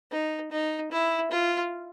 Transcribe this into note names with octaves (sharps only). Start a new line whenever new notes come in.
D#4
D#4
E4
F4